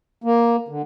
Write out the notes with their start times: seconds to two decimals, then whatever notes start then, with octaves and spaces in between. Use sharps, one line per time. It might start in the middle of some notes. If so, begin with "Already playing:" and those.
0.24 A#3
0.68 D3